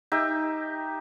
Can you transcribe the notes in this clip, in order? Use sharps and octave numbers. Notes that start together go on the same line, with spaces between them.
D#4 G4 E5